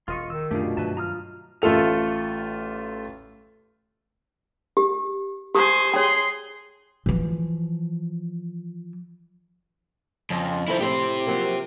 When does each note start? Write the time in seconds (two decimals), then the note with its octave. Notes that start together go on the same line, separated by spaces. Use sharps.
0.08 E1 F4 D#5 C6 C#6
0.30 D#3 E6
0.51 F#2 A#2 A3 D4 F4 G4 G#4
0.63 B2
0.77 G2 D#3 F#3 B4 E5 A5
0.97 F4 A#5 D#6 F6
1.62 A1 A3 F4 A4 F7
4.77 G4
5.55 G4 C5 G#5 D#6
5.94 G#4 C#5 G5 C6
7.06 E3 F3
10.30 F2 C#3
10.68 E3 F3 E4 A4 C5
10.80 A2 C4 G4 C5
11.27 F3 F#3 A#3